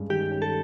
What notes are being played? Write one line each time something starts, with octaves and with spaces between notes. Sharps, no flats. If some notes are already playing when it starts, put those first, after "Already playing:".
Already playing: G2 G#3 C#4
D#3 G4
C#4
A4